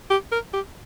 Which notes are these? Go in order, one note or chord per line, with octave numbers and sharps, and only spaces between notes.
G4
A#4
G4